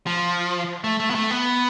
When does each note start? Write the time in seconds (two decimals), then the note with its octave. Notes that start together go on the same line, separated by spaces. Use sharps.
0.07 F3
0.84 A3
1.00 A3
1.10 B3
1.15 A3
1.31 B3